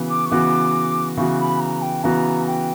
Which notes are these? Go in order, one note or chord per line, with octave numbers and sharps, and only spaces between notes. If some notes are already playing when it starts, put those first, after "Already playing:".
Already playing: C#3 E3 B3 F#4
D6
C#6
C#3 E3 B3 F#4 D6
C#3 E3 B3 F#4 C#6
B5
A#5
G5
C#3 E3 B3 F#4 A#5
G5